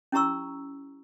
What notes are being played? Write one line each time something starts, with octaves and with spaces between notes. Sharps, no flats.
C#4 E4 G4 A#5 C#6 E6